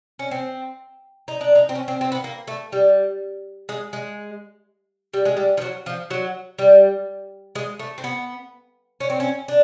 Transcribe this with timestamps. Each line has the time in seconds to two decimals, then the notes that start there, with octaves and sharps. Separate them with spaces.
0.19 C#4
0.31 C4
1.28 D#4
1.41 D4
1.55 D#4
1.69 C4
1.75 C#4
1.88 C4
2.01 C4
2.12 B3
2.24 A#3
2.47 A3
2.72 G3
3.69 G#3
3.93 G#3
5.14 G3
5.25 G#3
5.37 G3
5.57 F3
5.62 F#3
5.86 F3
6.10 F#3
6.59 G3
7.55 G#3
7.79 A3
7.98 C4
8.04 B3
9.00 C#4
9.10 C4
9.20 C#4
9.48 D4